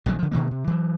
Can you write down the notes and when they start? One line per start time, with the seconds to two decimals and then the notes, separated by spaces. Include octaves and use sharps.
0.06 A#1 D3 D#3 F#3
0.19 D3 F3
0.31 B2 D#3 E3 A#3
0.51 C3
0.67 E3 F#3